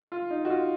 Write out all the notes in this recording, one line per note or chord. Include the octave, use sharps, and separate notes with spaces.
F4
D#4
F#4
F4